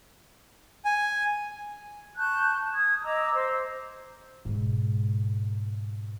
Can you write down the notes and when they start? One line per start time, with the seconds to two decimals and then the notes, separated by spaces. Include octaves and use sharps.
0.85 G#5
2.17 A5 C#6 F#6 G6
2.73 D#6 G#6
3.03 D#5 A#5 D6 E6
3.34 C5 E6
4.45 G#2 B2